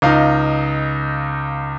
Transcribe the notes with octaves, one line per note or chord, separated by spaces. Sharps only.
C#2 D#4 F5